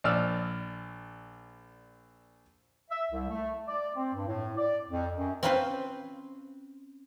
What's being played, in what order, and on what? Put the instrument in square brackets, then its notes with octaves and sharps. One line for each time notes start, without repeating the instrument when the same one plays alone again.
[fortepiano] A#1 D5 E6 F6
[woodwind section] E5
C2
A3
D5
C4
G2
A2
D5
F2
F#2
[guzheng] C4 C#4 F4 B4 C5